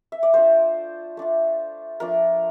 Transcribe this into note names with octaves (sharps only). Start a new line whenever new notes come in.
E5
D5
A3 D4 F4 C5
A3 D4 F4
F3 A3 D4 A#4